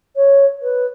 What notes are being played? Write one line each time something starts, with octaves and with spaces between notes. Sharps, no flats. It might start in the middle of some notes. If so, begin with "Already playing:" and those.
C#5
B4